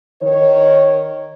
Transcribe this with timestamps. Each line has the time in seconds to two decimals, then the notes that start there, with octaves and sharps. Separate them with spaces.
0.22 D#3 C#5